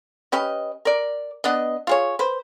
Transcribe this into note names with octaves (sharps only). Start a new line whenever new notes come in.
C#4 G4 B4 D#5
A#4 D5
B3 D4 D#5
F4 G#4 C#5
B4 C5